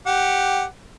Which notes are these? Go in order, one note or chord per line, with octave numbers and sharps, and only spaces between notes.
G4 F#5